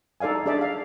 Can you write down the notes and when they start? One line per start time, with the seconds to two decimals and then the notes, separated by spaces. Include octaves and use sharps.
0.20 D#4 A4 D5 F5 G#5
0.46 D4 G#4 A4 D5 E5
0.61 F5